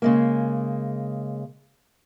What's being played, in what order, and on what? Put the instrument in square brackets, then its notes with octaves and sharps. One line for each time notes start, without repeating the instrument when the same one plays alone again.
[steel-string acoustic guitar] C#3 G#3 A#3